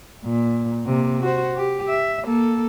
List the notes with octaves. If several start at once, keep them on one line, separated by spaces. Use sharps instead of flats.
A#2
C3 A#3
F#4 C5
G4
E5
A#3 A4